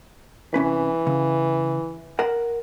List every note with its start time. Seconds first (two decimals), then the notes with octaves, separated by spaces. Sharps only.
0.54 C2 E3 C#4 B4
1.07 C#3
2.19 A#4 F#5